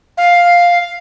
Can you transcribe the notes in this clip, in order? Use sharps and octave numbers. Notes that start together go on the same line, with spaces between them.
F5